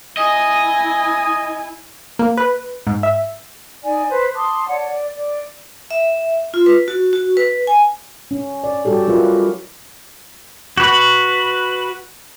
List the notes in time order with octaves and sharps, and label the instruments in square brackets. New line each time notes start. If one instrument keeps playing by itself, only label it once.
[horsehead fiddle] E4 G#5 [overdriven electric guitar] D#5
[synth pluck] A#3
B4
G#2
E5
[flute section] D#4 D5 G#5
B4 C5
A5 C6 D6 D#6
C#5 D5 F#5 A5
D5
D5
[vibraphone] E5
F4
B4
F#4
F#4
B4
G#5
[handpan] C#4
D5
G3 F#4 G4 A4
F#3 E4 F4 A#4 B4
[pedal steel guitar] F#4 B4